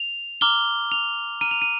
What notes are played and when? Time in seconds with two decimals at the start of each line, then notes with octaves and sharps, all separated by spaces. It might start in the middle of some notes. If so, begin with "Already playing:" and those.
Already playing: F7
0.41 A#5 D6 F6 G7
0.92 F7
1.41 A#5 F6 D#7
1.51 F7
1.62 D#7